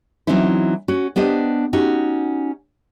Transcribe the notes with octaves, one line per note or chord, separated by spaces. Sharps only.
E3 F#3 C4 C#4 D#4 E4
C#4 F#4
B3 D4 G4 C5 D#5
C#4 D#4 F#4 G4